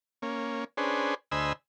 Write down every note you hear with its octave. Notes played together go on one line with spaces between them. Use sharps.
A#3 C#4
C#4 D4 G#4 B4 C5
D2 C5 D#5 G#5 B5 E6